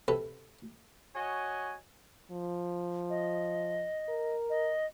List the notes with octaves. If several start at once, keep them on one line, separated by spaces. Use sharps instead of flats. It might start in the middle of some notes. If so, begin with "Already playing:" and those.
C3 A4 B4
F#4 C#5 D#5 G#5
F3
D#5
A#4
D#5